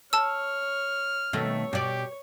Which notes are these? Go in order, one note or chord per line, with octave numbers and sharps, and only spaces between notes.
C#5 A5 E6 F6
B2 D#3 A3 C#5
B2 G4 D5